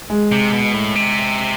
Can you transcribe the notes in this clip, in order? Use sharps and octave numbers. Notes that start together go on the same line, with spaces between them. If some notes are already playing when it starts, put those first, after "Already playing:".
G#3
C3
B2
A2
C3